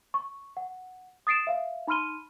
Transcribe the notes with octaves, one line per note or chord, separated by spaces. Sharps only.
C#6
F#5
D#6 A6 C7 D7 E7
E5 F5
D#4 B5 C6 F6 D#7 G7